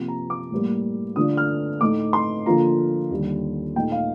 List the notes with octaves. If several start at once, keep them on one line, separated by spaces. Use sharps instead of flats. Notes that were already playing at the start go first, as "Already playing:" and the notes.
Already playing: C3 F3 A#3
A#5
D6
A2 G3 A#3
D3 A3 D4 F4 D#6
F6
A2 A3 D#4 D6
C6
D3 F3 A#3 F4 A#5
D#2 D3 G3
A#2 A3 D#4 G5
F5